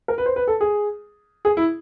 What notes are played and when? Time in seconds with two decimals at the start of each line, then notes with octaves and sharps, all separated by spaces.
0.08 A#4
0.18 B4
0.26 C5
0.36 B4
0.48 A4
0.61 G#4
1.45 G#4
1.57 E4